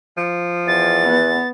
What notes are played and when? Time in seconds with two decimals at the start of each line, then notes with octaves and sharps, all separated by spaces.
0.17 F3
0.68 E2 A6
1.05 B3